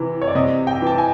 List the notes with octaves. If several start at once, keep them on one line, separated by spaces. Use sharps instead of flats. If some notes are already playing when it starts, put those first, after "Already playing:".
Already playing: C3 E3
C#5
D5
C3 D#5
G5
E3 A5
G#5